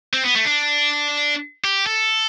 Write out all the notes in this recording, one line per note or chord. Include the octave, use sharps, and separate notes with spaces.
C4
B3
A3
D4
G4
A4